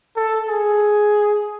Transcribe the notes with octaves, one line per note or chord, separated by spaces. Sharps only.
A4
G#4